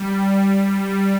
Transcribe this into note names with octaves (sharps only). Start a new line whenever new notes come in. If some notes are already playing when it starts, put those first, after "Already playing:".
Already playing: G3